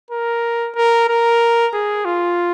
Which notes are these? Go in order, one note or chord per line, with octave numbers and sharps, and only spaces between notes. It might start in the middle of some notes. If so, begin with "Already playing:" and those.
A#4
A#4
A#4
G#4
F4